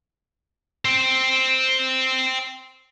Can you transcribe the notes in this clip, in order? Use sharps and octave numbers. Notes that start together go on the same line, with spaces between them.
C5 G5